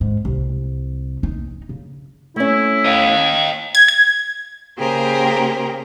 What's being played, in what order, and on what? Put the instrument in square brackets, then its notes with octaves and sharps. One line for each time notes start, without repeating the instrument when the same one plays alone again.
[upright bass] G#2
C2
D#4
C#3
[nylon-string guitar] A3 C#4 [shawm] E4
[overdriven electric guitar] D#5 F5
[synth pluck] G#6
G#6
[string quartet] C#3 A#3 G4 G#4 A#4 C5